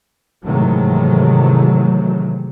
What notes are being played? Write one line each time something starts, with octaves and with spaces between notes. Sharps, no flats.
G#2 C3 D#3 E3 F#3 A3